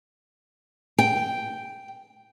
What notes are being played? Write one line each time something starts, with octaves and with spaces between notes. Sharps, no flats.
G5